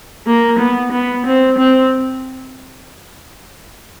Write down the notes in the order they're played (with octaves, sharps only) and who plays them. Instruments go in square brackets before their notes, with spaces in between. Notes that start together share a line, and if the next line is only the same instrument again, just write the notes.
[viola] A#3
B3
B3
C4
C4